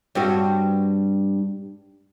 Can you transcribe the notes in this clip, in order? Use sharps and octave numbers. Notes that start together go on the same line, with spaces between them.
G2 C4 F#4